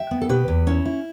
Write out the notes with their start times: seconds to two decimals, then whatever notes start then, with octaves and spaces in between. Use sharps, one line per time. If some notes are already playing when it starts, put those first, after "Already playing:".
Already playing: E5 G5
0.11 B3
0.21 A4
0.29 B2 G4 B4
0.48 E2
0.67 C#4 E4
0.85 E4